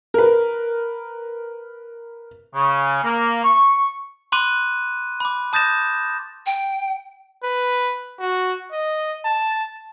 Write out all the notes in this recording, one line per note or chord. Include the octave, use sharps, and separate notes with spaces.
A#4 B4
C#3
A#3
C#6
B5 C6 D6 F#6 D#7
B5 D6
A5 D#6 G6 A6 A#6 E7
G5
B4
F#4
D#5
A5